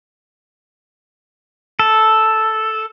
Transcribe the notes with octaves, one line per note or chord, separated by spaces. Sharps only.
A4